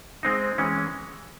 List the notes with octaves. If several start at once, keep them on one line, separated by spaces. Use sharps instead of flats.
G#3 C4 D#4
E3 G#3 C#4